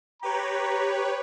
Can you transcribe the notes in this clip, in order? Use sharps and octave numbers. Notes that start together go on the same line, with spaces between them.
G4 B4 C#5 A#5